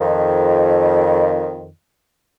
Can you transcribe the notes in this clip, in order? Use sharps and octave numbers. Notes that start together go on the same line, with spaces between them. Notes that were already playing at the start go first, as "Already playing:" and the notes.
F2 D#3